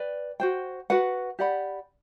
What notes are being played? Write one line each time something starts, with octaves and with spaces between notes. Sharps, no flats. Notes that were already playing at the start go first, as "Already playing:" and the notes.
Already playing: B4 D5 G5
F#4 C5 G5
F#4 B4 F#5
G4 D5 F#5 B5